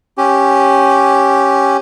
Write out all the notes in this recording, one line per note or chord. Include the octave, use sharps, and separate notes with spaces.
C#4 G4